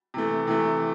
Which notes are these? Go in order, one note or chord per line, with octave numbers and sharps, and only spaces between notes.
C3 E3 A3
C3 E3 A3